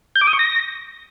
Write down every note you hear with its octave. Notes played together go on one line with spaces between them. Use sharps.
G6
D6
D#6
C#6
A#6